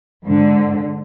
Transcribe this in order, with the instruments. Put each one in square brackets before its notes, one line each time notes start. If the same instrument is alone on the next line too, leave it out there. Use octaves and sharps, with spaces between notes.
[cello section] G#2 D3